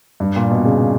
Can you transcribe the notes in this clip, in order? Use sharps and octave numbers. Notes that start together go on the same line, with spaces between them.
G2
A#2
B2
C#3